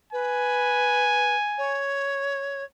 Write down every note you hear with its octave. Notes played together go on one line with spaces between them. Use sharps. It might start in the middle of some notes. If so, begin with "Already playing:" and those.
B4 G#5
C#5